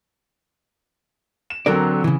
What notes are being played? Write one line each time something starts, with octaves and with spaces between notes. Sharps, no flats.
E7
D3 F#3 C4 A4 A#4 D5
C#3 E3